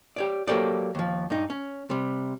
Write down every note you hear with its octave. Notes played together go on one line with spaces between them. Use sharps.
G4 C#5 D5
F#3 A#3 G4 A4 C5 D5
D#2 F3
G2 D#4
C#4
C3 G3